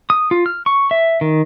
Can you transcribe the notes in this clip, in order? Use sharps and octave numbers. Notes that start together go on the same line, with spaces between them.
D#6
F4
F6
C#6
E5
D#3